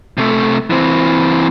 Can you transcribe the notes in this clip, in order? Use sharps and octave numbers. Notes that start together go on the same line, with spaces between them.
C3 A3
E3 C4